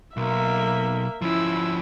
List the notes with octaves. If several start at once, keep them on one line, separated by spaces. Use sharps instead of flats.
B1 A#3 E5
F3 C#4 E4 E6